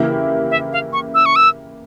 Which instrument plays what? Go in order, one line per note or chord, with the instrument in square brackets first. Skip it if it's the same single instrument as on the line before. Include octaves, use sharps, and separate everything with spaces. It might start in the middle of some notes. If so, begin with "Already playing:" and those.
Already playing: [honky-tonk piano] C#3 E3 A#3 E4 G4
[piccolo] E5
F5
C#6
E6
C#6
E6